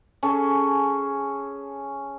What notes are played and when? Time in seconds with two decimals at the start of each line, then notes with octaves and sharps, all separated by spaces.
0.23 C#4 G#4 A4